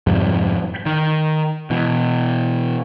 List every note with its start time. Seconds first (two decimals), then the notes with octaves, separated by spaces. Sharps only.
0.07 F2 G#2 C3 G3
0.86 D#3
1.70 B2 E3